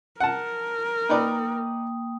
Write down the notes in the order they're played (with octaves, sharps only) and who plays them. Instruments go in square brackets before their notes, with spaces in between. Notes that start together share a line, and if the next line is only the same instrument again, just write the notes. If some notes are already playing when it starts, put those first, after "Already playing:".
[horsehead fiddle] A#4 [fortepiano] F#5 A5
[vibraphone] A#3 G5 D#6 [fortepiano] D#4 B4 D5